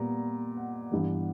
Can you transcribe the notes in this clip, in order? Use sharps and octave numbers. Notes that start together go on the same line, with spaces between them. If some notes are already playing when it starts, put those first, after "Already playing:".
Already playing: A#2 G3 B3 A#5
F#5
G2 E3 G3 B3